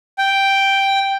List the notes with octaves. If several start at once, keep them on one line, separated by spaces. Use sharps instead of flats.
G5